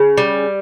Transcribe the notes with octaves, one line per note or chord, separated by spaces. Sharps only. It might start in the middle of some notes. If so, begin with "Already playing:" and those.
Already playing: C#3
G3